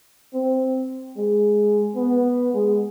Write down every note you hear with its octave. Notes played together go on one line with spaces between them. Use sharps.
C4
G#3
B3
G#3